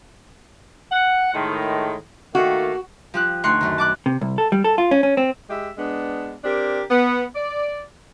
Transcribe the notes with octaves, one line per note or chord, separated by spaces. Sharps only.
F#5
A2 D#3 G#3
D#3 A3 A#3 F#4
F3 G4 F#6
D2 D#4 C6 C#6 F#6
F#2 D#3
A5 D6 F#6
C3
C2
A4
G3
A4
F4
C#4
C#4
C4
G#3 G4 E5
G#3 B3 D4
C4 D4 G4 A#4
B3
D5